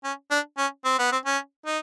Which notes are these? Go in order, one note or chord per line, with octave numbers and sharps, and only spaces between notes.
C#4
D4
C#4
C4
B3
C4
C#4
D#4